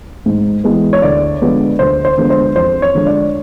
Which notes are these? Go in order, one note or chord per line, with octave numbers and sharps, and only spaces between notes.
G#2
E3 G#3 B3
C#5
D2 D5
D3 F3 G#3 B3
D2 C5
C5
D3 F3 G#3 B3
C5
F2 C5
C#5
D3 F3 G#3
D5